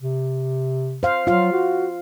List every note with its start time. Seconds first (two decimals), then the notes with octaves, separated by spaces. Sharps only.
0.02 C3
1.03 C5 F5
1.27 F#3 F4 F5
1.52 F#4